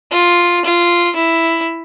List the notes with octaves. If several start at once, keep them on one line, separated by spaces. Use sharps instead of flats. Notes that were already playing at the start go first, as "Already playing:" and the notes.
F4
F4
E4